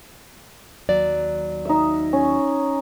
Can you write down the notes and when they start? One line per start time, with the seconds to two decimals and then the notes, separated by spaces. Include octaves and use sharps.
0.89 D#2 F#3 D5
1.65 D#4 E5
2.13 C#4